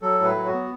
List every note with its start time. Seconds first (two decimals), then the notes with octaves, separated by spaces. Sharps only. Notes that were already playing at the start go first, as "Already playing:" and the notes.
0.02 F#3 A4
0.19 A2 B4
0.35 F#3
0.46 F#4
0.52 B3